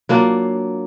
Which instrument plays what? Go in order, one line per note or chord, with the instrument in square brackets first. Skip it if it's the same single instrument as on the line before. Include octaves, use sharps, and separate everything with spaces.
[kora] F#3 A#3 D4 F4